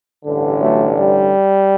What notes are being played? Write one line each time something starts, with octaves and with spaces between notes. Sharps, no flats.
A1 G2 D3
F#3 A3
G3